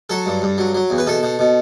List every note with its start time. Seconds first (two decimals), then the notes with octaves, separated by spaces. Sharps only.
0.10 F#3 A4
0.26 G2
0.42 G2
0.58 F#3
0.75 F#3
0.90 E2
0.98 B4
1.07 B2 A4
1.23 B2
1.39 B2